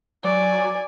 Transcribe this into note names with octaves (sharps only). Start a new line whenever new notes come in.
F#3 D5 G#5